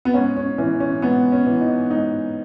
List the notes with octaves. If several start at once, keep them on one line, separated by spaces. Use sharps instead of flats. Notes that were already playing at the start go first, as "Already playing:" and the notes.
B3
G#2 C#4
C#4
E3 C#4
C#4
G#2 B3
C#4
E3
D#4
G#2 D#4